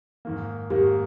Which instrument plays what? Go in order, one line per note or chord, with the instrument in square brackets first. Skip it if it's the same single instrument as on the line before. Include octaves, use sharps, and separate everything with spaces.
[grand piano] G#2 D#3 A#3
[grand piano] G#2 D#3 A#3 [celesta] G4